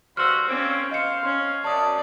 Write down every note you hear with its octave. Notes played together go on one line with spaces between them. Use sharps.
G2 F#4 C5 E6 F6
A#3 C4 C#4
C5 D#5 F5 C#7
C#4
F#2 D5 A5 D#6